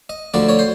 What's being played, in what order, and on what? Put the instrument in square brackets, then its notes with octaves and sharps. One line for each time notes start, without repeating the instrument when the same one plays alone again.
[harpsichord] D#5
D2 D3 F3 D5
C#5
C5